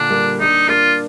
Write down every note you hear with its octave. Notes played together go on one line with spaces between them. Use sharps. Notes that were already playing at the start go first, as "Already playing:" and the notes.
Already playing: A#2 D3 D4
G3 A#3
A#3 D4 D#4
A#3 D4 F4